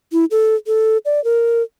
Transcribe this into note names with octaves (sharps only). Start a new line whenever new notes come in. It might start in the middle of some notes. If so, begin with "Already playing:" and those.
E4
A4
A4
D5
A#4